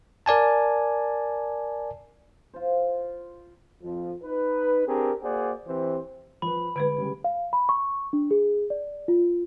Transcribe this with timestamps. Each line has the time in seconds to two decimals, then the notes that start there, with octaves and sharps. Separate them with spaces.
0.26 A#4 D5 G#5 A5
2.53 F4 C5
3.82 F2 F3
4.23 D#4 B4
4.86 C4 D4 G4 G#4 A#4
5.22 A#3 F#4 G#4 C5 D5 F#5
5.67 E3 C4 G4 C5
6.42 F3 B4 B5
6.76 D3 G#3 B4 G#6 D7
6.98 C#3 G3 G#3
7.24 F5
7.53 B5
7.69 C#6
8.13 D4
8.31 G#4
8.70 D5
9.08 F4